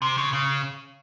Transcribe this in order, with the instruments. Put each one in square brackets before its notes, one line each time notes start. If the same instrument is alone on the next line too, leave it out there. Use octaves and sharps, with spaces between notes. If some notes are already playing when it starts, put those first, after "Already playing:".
[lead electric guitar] C3
C#3
C#3